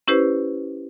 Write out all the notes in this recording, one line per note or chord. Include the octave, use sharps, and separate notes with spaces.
C#4 E4 G4 B4 C5